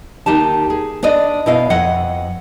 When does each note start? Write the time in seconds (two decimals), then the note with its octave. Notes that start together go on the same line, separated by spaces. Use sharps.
0.26 D#2 D#4 G4 A5
0.70 G#4
1.03 D4 B4 D5 D#5
1.46 B2 E4 D#5 F5
1.70 F2 D#5 F#5